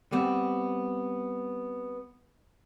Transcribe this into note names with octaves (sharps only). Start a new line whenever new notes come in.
G3 B3 C4